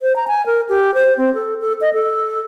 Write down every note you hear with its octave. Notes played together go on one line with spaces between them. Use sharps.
C5
A#5
G#5
A#4
G4
C5
C4
A4
A4
D#5
A4